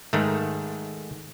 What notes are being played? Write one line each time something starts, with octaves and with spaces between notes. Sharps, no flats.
G#2 D#3 A3